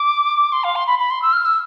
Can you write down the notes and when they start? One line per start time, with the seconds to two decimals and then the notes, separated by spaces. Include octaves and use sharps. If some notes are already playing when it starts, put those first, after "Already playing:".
Already playing: D6
0.52 C6
0.64 F5
0.76 C6
0.87 B5
0.99 B5
1.10 C6
1.22 E6
1.33 F6
1.45 E6